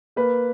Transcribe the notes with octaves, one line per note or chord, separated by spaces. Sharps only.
A#3 B4